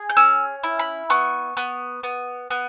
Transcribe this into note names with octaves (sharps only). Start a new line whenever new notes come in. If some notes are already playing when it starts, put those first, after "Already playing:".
Already playing: G#4
G6
C#4 E6
E4
B5
B3 C#6
B3
B3
B3